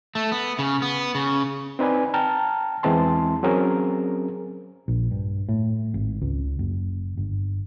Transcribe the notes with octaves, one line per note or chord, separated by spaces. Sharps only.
A3
B3
C#3
B3
C#3
C4 D#4 B4 D5 G#5 B5
G5 A5 A#5 F6
E2 E3 G#3 C4 A5 C6
F#3 C4 C#4 G#4 A#4 C5
A#1
G2
A2
G#1
C#2
F#1
G1